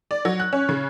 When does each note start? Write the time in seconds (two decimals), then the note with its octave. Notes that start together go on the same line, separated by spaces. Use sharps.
0.11 D5
0.25 F#3
0.40 F#6
0.53 C#4
0.69 C#3